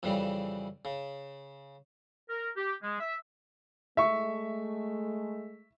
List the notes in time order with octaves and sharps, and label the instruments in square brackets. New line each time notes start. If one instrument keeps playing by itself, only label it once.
[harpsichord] F2 C#3 E3 G3
C#3
[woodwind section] A#4
G4
G#3
E5
[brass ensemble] G#3 A3 [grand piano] E5 C#6